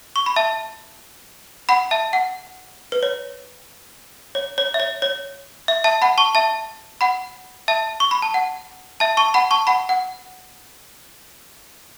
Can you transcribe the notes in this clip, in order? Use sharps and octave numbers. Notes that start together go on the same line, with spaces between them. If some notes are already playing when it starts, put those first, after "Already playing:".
C#6
B5
E5 A5
F#5 B5
E5 A5
F#5
B4
C#5
C#5
C#5
E5
C#5
C#5
E5
E5 A5
F#5 B5
A5 C#6
E5 A5
F#5 B5
E5 A5
C#6
B5
A5
F#5
E5 A5
A5 C#6
F#5 B5
A5 C#6
F#5 B5
F#5